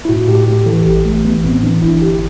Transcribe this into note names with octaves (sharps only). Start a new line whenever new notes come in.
E4
A2 F#4
A2 G4
A2 G4
E3 A4
A1 G4
A1 A3
E3 B3
B3
A2 C4
E3 D4
G1 E4
G1 G4